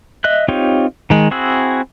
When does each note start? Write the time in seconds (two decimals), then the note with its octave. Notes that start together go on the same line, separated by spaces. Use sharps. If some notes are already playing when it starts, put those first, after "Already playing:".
0.24 D#5 E5 F#6
0.48 C4 D#4 F4 G4 C#5
1.10 D#3 G#3
1.31 C4 E4 F#4 G#4 E6